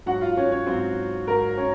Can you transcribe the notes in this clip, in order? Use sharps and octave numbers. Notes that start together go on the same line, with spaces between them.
G#2 F#3 F#4 F#5
F4 F5
C#4 C#5
C#4 C#5
G#2 F#3 C4 C5
G#2 F#3 A#4
C#4 C#5